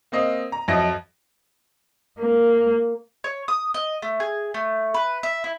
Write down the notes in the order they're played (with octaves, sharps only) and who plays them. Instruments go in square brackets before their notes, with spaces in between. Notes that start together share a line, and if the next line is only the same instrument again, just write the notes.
[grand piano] A#3 C4 D#5 F5
A#5
F2 F3 F#3 D#5 E5 A#6
[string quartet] A#3
[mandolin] C#5
D#6
D#5
A3
G#4
A3
B4
E5
E4